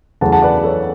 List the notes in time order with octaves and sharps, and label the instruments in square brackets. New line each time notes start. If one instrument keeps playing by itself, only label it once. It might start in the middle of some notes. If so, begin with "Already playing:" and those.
[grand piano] E2 C#3 F#3 A3 C#4 F#5 A5
F#5 A5
B4 D5
A4 C#5